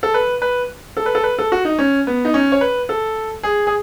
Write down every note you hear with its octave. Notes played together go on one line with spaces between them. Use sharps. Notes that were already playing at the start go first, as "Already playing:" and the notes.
A4
B4
B4
A4
B4
A4
B4
A4
F#4
D#4
C#4
B3
D#4
C#4
C#5
B4
A4
G#4
G#4